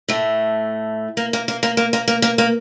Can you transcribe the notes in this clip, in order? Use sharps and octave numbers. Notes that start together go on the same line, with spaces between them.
A2 A3
A#3
A#3
A#3
A#3
A#3
A#3
A#3
A#3
A#3